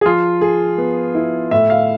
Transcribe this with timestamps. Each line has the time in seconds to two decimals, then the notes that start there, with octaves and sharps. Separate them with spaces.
0.01 G#4
0.05 F3 F4
0.41 G#4
0.78 B3
1.15 E4
1.51 A2 E5
1.70 F5